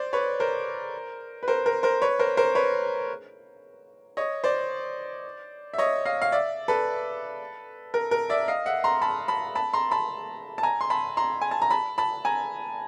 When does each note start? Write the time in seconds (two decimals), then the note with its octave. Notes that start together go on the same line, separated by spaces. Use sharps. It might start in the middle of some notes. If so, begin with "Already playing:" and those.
Already playing: C5 D5
0.13 B4 C#5
0.40 A#4 C5
1.43 B4
1.48 A#4 C5
1.66 A#4
1.83 A#4 C5
2.02 B4 C#5
2.19 A#4 C5
2.37 A#4 C5
2.55 B4 C#5
4.17 C#5 D#5
4.44 C5 D5
5.74 E5
5.78 C#5 D#5
6.05 D#5 F5
6.22 F5
6.32 D5 E5
6.68 A4 B4
7.94 A#4
8.11 A#4
8.30 D5 E5
8.48 D#5 F5
8.66 E5 F#5
8.84 A#5 C6
9.02 A5 B5
9.28 A5 B5
9.55 A5 B5
9.73 A#5 C6
9.91 A5 B5
10.58 A5
10.63 G#5 A#5
10.81 C6
10.90 A5 B5
11.17 A#5 C6
11.41 G#5
11.51 A5
11.62 A#5
11.70 A5 B5
11.98 A5 B5
12.25 G#5 A#5